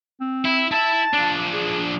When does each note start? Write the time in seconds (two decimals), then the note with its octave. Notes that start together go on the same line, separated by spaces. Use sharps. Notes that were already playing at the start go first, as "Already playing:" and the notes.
0.20 C4
0.45 E4
0.72 E4 E5 A5
1.14 F3 D4
1.53 G#4